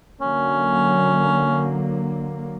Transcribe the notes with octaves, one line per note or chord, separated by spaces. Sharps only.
D3 F#3 A#3 C#4